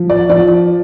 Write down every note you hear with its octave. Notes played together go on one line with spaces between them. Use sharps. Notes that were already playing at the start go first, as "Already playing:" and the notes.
Already playing: F3
D5
F3 D5